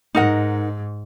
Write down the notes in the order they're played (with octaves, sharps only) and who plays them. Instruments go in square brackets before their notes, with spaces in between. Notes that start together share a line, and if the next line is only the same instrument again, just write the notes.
[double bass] G#2 [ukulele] D#4 A#4 F#5